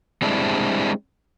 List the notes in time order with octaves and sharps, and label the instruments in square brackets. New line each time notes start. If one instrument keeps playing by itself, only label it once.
[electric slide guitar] G3 G#3 C4 D4 E4